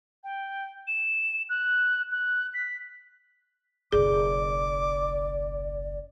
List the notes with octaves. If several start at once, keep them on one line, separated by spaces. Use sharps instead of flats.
G5
E7
F#6
F#6
B6
F#1 B1 G#4 D5 D6